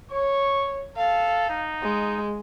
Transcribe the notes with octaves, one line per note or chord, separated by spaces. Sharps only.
C#5 C#6
A4 F5
D#4
G#3